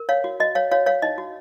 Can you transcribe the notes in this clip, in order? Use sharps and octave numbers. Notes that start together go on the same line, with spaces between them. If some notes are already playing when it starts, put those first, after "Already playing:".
Already playing: A#4
C#5 F5
F#4
F#4 D#5
C#5 F5
F#4 C#5 F5
C#5 F5
D#4 D#5
F#4